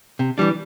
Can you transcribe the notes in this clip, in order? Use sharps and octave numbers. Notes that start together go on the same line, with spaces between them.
C3
E3 G3 D4